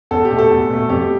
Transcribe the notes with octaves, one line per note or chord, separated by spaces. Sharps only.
E2 A4
G4
B2 A3
A4
E2
B2 A3
F2 G4